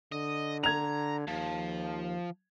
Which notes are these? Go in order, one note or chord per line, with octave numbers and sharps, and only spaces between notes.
D3 D#5
A#5 G#6 F7
D#2 F3